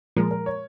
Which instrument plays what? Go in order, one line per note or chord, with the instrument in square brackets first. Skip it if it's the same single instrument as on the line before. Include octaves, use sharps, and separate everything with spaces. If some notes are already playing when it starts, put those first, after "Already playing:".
[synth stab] A#2 F3 G#3 [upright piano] A#4
[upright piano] A#4
C#5